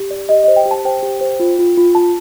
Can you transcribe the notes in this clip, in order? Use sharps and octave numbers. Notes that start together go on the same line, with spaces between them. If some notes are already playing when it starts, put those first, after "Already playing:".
Already playing: G4
D5
G4 D#5
C5 D#5
G5
G4
A5
C5 G5
G4
C5
F4
F4
F4
F4 A5